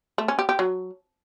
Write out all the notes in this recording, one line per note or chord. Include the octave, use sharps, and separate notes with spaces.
A3
C#4
G4
G4
F#3